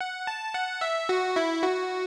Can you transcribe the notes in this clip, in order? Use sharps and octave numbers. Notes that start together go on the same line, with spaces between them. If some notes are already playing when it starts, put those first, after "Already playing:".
F#5
A5
F#5
E5
F#4
E4
F#4